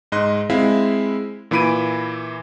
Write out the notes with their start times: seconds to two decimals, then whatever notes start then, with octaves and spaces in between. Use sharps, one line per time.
0.12 G#2 D#5 C6 F#6
0.50 G#3 C4 E4 E5 F5
1.51 A#2 E3 E4 B5 D7 D#7